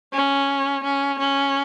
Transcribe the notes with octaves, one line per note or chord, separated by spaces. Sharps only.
C#4
C#4
C#4